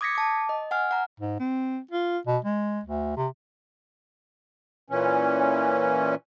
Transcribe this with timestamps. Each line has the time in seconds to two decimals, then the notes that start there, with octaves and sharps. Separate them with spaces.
0.01 D6 D#6 G#6 A#6 B6 C#7
0.15 A5 D6
0.49 D#5
0.71 F#5 G#5 F6
0.91 F#5 A#5
1.20 G#2
1.40 C4
1.91 F4
2.27 B2
2.45 G#3
2.85 D2
3.17 C3
4.90 A#2 E3 C#4